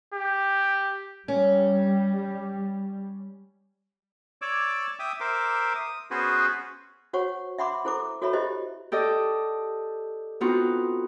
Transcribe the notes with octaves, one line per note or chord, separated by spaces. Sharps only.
G4
G3 C#4
C#5 D5 D6 E6
E5 G5 D6 D#6
A#4 C5 E5 D6
D#6
B3 C#4 F#4 G#4 B4 C5
F#4 C5 C#5 F#5 C#6
E5 F#5 B5 C6 D6
E4 A4 C5 A#5 D6
F#4 A4 C#5 E5 B5
E4 G4 C5 D#5
G4 A4 D5 D#5
B3 C4 D#4 F4 F#4